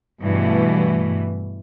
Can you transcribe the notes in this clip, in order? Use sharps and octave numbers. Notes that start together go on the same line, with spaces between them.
G2 B2 E3 A3